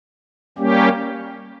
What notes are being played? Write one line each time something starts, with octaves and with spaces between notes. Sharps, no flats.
G3 A#3 C#4 G4